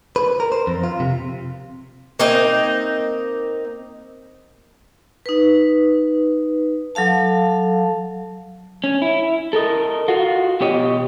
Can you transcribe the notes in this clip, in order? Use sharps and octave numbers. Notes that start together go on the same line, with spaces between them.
B4
A#4
C5
F2
F4
C3
A#3 C4 D#4 D#5
D#4 B4
F#3 A4 F5 A5
C#4
E4
A4 A#4 D#5
F4 F#4
B2 G4 C#5 D#5